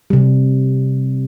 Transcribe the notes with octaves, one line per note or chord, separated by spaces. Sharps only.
C3 G3